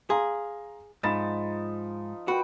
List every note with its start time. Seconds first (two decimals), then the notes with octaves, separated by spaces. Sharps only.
0.10 G#4 F5 A#5 C6
1.03 G#2 F3 D#4 B5 A6 E7
2.28 F#4 B4 G5